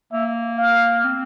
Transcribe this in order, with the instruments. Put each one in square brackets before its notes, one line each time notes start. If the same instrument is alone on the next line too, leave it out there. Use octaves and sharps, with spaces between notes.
[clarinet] A#3 [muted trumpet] E5
[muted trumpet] F5
[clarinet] C4